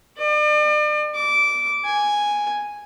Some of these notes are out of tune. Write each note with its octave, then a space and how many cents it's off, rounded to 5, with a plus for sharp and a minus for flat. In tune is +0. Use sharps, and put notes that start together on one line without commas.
D5 +40
D6 -15
G#5 -5